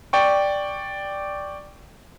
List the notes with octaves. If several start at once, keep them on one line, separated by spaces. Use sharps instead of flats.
D5 G5 C#6